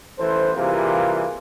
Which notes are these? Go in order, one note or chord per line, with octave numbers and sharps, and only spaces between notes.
A1 E3 A4 C5
C3 E3 G3 A#3 F4 G#4